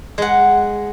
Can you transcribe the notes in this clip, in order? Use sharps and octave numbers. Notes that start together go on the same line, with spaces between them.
G#3 F#5